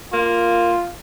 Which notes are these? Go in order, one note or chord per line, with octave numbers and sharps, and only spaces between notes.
A#3 F4